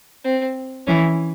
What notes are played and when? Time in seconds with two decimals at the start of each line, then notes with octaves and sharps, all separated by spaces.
0.24 C4
0.87 E3 C#4